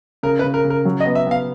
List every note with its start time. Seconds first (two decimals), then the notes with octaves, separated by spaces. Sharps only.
0.23 C#3 A#4
0.39 B4
0.44 C#3
0.54 A#4
0.65 C#3
0.70 A#4
0.85 F#3
1.00 D#5
1.06 B3
1.15 E5
1.27 B3 F5